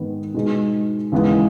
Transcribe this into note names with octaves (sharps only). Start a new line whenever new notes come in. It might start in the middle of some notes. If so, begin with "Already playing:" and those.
Already playing: G#2 D#3 G#3 B3
B2 G#3 D#4 G#4
D#2 C#3 E3 G#3 B3